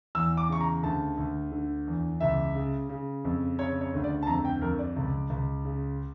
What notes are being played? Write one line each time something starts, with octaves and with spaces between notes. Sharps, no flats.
E2 E6
D6
C#3 C#6
A#5
D2 A5
D2
D3
E2
C#2 E5
C#3
C#3
F2
C#3 C#5
C#5
D2
D5
A5
F2 A#5
G5
F2 A#4
D5
C#2
C#2
C#3